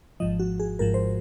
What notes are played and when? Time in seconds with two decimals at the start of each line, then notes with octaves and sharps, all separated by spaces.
0.20 G#1 G#2 F3 D#5
0.39 F#4
0.60 G#4
0.79 G#1 G#2 F3 A#4
0.94 C5